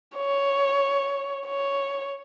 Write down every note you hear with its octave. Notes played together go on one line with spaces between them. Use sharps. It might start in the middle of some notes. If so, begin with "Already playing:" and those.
C#5
C#5